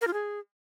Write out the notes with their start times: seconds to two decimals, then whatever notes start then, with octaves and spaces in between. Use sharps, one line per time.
0.01 A#4
0.07 F4
0.13 G#4